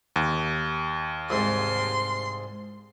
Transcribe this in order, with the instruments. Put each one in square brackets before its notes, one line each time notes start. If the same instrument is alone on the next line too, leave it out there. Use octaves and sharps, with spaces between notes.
[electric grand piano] D#2
[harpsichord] C2 G#2 [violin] C6